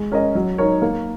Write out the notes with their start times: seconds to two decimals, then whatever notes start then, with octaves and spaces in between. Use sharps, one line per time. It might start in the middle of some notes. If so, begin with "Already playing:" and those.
Already playing: G#3
0.12 C#4 A#4 D#5
0.35 F#3
0.58 D#4 A#4 C#5
0.82 A#3